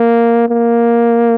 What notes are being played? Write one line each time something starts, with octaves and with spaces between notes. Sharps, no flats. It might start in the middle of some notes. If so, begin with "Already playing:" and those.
Already playing: A#3
A#3